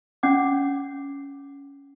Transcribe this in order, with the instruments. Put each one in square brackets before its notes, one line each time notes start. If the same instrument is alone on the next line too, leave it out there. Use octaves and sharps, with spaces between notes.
[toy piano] C#4 F#5 D6